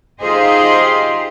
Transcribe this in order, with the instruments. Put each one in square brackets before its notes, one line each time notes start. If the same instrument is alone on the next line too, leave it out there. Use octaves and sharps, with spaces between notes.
[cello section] D#4 F4 G4 G#4 C5 D#5